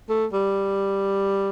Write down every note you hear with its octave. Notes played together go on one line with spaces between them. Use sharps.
A3
G3